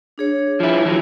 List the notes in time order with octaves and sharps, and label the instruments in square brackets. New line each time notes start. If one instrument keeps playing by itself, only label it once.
[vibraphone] D4 G#4 C#5
[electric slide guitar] F3 E4
E3 F#3